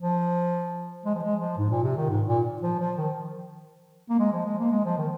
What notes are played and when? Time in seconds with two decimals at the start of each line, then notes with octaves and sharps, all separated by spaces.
0.01 F3
1.05 G#3
1.15 F3
1.23 G#3
1.41 F3
1.58 G#2
1.70 A#2
1.84 C3
1.97 D#3
2.10 G#2
2.28 A#2
2.62 F3
2.79 F3
2.97 D#3
4.10 A#3
4.19 G#3
4.32 F3
4.45 G#3
4.58 A#3
4.71 G#3
4.85 F3
4.98 D#3